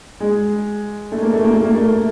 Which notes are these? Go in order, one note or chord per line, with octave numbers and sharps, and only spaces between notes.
G#3
A3
A#3
A3
A#3
A3
A#3
A3